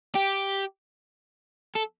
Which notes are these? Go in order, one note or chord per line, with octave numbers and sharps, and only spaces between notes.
G4
A4